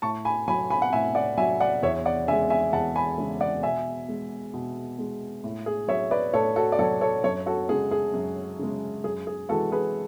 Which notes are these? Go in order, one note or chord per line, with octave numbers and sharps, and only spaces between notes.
A2 A5 C#6
G#5 B5
F#3 G#5 B5
G#5 B5
F#5
A2 E5 G#5
D5 F#5
F#3 E5 G#5
D5 F#5
E2 C#5 E5
D5 F#5
C#3 G#3 E5 G#5
E5 G#5
E2 F#5 A5
G#5 B5
C#3 G#3
D5 F#5
B2 E5 G#5
G#3
B2
G#3
A2
G#4
F#3 C#5 E5
B4 D5
A2 A4 C#5
F#4 A4
D5
F#3 A4 C#5
A4 C#5
F#2 A4 C#5
F#4 A4
C#3 G#3 G#4
G#4
F#2
C#3 G#3
F#2 G#4
G#4
E3 G#3 F#4 A4
G#4 B4